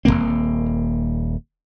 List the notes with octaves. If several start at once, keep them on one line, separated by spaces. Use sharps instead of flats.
D#1 A2 A#3 C4